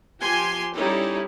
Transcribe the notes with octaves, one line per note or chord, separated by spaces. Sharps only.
F3 G4 G#5 C6
G3 C#4 D#4 E4 A4